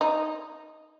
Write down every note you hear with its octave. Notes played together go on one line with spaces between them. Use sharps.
D#4